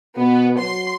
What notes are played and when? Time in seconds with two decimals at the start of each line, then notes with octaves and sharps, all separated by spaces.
0.17 B2 B3
0.59 F#3 C6